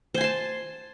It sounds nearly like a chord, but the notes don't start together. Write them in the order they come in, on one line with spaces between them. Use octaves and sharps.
C5 G#5 C6 A5